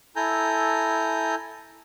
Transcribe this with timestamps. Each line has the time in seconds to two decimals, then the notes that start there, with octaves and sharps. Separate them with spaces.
0.16 E4 A4 G#5 A#5 G6